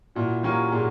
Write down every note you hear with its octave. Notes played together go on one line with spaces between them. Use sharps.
A#2 E4 F#4
F#3 A#3 C#4 F4 G4
A#2 F#4 G#4